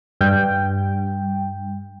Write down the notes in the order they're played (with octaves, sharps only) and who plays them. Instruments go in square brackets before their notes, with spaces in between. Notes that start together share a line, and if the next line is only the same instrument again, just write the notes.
[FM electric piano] G2 G5